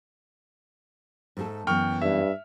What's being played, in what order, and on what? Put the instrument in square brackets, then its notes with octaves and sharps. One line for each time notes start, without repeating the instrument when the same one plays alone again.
[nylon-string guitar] G#2 A3 A4
[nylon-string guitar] F#2 E3 B3 [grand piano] G5 C#6 F6
[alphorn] G2 [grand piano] E5